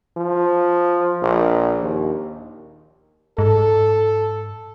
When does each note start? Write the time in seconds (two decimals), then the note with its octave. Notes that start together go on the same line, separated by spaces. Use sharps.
0.17 F3
1.22 A#1
1.82 D#2
3.38 G#2 A4